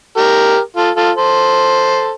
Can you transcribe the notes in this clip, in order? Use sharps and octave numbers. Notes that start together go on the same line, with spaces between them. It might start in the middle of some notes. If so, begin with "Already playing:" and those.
G4 A#4
F4 A4
F4 A4
A4 C5